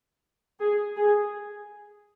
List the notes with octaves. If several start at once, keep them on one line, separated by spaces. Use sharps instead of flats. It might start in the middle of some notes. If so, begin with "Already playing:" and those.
G#4
G#4